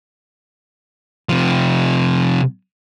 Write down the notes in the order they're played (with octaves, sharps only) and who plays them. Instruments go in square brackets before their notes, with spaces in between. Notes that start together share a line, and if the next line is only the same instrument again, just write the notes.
[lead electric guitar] C3 F3